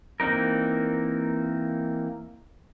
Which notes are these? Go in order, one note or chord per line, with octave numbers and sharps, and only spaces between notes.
E3 A#3 C4 D#4 A#4